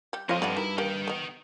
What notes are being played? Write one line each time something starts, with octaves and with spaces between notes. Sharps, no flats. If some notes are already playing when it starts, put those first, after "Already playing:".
G3 G4
F2 C4 C#5 D#5 F5
G2 A3 D5 F#5
D#4 E4 F#4 A#4
A#3 D#4 G4 G5
B3 D#5